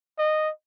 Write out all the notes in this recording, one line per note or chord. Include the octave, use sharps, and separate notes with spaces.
D#5